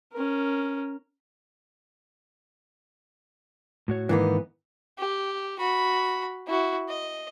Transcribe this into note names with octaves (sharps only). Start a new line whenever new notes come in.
C#4 A#4
A2 F#4 C#5
G#2 D#3 E3 A#3 B3 D#4
G4
F#4 B5
E4 F#4
D#5